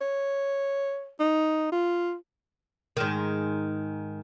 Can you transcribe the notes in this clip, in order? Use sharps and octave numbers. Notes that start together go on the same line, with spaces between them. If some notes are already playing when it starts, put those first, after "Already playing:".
C#5
D#4
F4
G#2 D#3